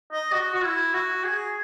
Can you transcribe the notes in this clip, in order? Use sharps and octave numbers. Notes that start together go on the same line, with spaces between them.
D#5
F#4
F#4
E4
F#4
G#4